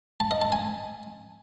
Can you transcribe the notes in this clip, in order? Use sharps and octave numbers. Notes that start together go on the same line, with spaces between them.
A5
D#5
A5
G#5